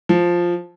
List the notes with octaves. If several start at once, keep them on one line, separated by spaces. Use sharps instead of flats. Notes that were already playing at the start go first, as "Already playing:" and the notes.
F3